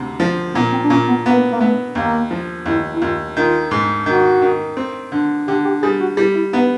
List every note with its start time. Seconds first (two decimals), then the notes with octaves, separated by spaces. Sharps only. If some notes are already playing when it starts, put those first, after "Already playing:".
Already playing: D2 C3
0.20 F3
0.54 A#2 B3
0.72 C4
0.83 D4
0.90 A#2 C#4
1.08 B3
1.26 A#3 B3
1.52 A#3
1.60 A3 B3
1.95 D#2 A#3
2.31 F3
2.66 D#2 E4
2.94 E4
3.01 D#2 F4
3.36 D#3 F4
3.71 G#2
4.06 D#3 F#4
4.42 D#3
4.77 C4
5.12 D3
5.48 D3 G4
5.65 G4
5.82 G3 G#4
6.00 F#4
6.17 G3 E4
6.35 E4
6.53 B3 D#4